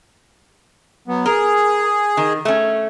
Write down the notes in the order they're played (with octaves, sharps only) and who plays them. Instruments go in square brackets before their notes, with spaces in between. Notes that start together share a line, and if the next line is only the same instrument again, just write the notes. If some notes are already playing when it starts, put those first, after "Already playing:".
[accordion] F#3 B3
[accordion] G#4 [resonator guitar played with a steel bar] A#4
[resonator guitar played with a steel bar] D#3
A3 C#4